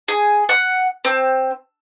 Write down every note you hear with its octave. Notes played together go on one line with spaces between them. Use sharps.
G#4
F#5
C4